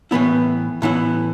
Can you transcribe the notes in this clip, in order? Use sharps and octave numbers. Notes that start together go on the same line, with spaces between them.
A2 E3 B3 E4
A2 E3 B3 E4